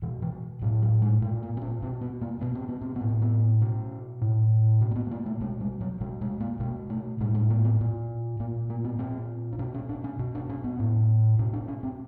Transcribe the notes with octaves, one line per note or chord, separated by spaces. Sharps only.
B2 E3
E3
A2 F#3
F#3
G#3
A#2 A3
A#3
C4
C#4
B2 C4
B3
A#3
B2 B3
C4
B3
C4
B3
A2
C4
B3
B2 C#4
A2
B2 C#4
A#3
B3
A3
A#3
A3
B2 G#3
G3
F#3
B2 G#3
G#3
A#3
B2 G#3
A3
A2 G#3
G#3
A#3
B3
A#2
A#2 A#3
A#3
B3
A#2 C4
D4
B2 C#4
C#4
D4
C#4
B2
D4
C#4
B3
A2
B2 C#4
D4
C#4
C4